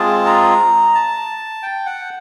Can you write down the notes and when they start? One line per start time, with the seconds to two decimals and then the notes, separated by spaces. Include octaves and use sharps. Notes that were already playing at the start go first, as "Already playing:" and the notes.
Already playing: G#3 C4 F4 G#4 A5
0.26 A#5
0.95 A5
1.63 G5
1.86 F#5